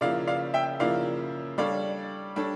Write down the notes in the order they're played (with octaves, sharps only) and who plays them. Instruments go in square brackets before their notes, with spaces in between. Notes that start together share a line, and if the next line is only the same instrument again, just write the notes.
[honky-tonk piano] C#3 F3 A#3 E4 [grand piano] D5 F5
[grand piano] D5 F5
E5 G5
[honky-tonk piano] C#3 F3 A#3 E4 [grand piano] D5 F5
[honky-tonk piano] G3 D4 A4 C#5 [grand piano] D5 F5
[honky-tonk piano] G3 D4 A4 C#5